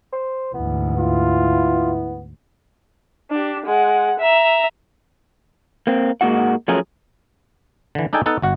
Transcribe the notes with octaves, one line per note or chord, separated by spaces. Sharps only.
C5
D2 G#2 E3 B3
E4 F4
D4 G4
G#3 F#5
E5 A#5
A#3 C4
G#2 G#3 A#3 E4 F#4 F#5
F3 F#3 A3 C#4 G#4 A#4
D3 E3
D4 D#4 G#4 A4 G5 G#5
B3 D#4 A4 F#5 A5
G1 F#4 F#5